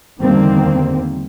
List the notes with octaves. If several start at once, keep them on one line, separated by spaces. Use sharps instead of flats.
E2 D3 D#3 G3 A#3 C4